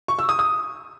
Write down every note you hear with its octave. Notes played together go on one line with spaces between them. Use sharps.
C#6
E6
D#6
D#6